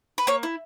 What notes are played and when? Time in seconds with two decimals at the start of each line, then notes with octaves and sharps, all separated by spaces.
0.18 B4
0.27 A#3 C#5
0.43 E4